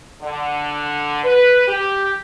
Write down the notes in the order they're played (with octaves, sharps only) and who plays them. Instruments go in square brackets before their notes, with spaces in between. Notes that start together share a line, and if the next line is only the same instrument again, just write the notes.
[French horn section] D3
B4
G4